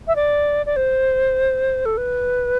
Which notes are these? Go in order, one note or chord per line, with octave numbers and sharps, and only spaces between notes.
E5
D5
D5
C5
A4
B4